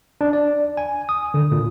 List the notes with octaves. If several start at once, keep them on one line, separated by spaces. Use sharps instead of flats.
D4
D5
G#5
D#6
D3
A#2